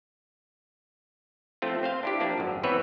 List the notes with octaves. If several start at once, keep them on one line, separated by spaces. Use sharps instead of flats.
F3 A3 C4 F4
C4 C5 F5
D4 E4 G4
F3 A#3 D4
G#1 F#2
E3 B3 C4 B4 C#5 E5